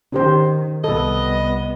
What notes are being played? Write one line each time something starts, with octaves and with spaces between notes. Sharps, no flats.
D#3 C#4 G4 C5
C2 B3 A4 D#5